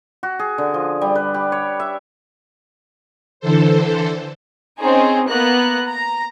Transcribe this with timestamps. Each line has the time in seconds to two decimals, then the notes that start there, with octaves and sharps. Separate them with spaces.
0.23 F#4
0.39 G#4
0.58 D3
0.74 F3
1.01 G3
1.15 B4
1.34 G4
1.52 C#5
1.80 E5
3.40 D3 E3 A4 C5
4.81 C4 C#4 D#4 G#4 C5
5.29 A#3 B3 A#5 F#6
5.86 A#5